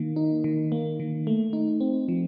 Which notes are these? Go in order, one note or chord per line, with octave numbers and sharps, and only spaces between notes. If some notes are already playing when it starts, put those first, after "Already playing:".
Already playing: D#3 A#3
D#4
D#3
A#3
D#3
A3
D#4
C4
F3